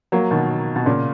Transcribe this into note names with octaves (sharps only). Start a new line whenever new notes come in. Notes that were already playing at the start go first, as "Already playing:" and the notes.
F#3 A#3
B2 D#3
B2
A#2 C#3